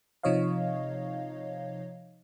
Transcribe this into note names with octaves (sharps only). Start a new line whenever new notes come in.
C3 F3 D#4 C#5 D#5 F5